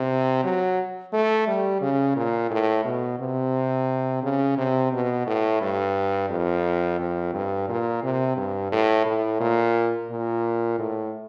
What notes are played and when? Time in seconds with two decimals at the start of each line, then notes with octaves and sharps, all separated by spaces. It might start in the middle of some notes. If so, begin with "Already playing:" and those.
Already playing: C3
0.44 F#3
1.13 A3
1.47 G3
1.81 C#3
2.16 A#2
2.50 A2
2.85 B2
3.19 C3
4.23 C#3
4.58 C3
4.93 B2
5.27 A2
5.61 G2
6.30 F2
7.00 F2
7.34 G2
7.68 A#2
8.03 C3
8.37 G2
8.72 A2
9.06 A2
9.40 A#2
10.10 A#2
10.79 A2